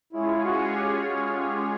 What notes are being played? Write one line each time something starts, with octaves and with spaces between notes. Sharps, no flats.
G#3 C#4 E4 F4 G#4 C#5
F#4
G4
F#4
G4